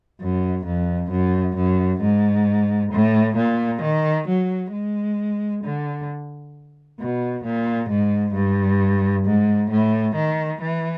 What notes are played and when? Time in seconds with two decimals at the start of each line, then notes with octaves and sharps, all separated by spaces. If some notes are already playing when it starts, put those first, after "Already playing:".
0.21 F#2
0.66 F2
1.11 F#2
1.56 F#2
2.01 G#2
2.93 A2
3.37 A#2
3.82 D#3
4.28 F#3
4.72 G#3
5.64 D3
7.00 B2
7.44 A#2
7.90 G#2
8.34 G2
9.26 G#2
9.71 A2
10.15 D#3
10.61 E3